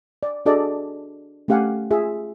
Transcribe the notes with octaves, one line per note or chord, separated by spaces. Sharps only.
D5
D4 F#4 G#4 A4 D5 D#5
A3 C#4 G4 F5 F#5 G#5
F4 G#4 E5